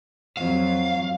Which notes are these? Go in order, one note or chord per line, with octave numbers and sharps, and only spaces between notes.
F2 F#3 F5